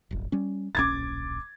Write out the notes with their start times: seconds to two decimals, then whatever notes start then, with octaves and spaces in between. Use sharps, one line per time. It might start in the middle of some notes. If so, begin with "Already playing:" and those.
0.11 D1 G1
0.32 G3 C#4
0.75 D1 A#1 C#4 D6 G#6 A6